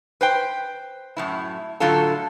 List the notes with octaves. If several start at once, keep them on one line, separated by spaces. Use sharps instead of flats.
B4 C5 G5
F#2 A2 E4
A2 D3 F#3 D4 F4 A4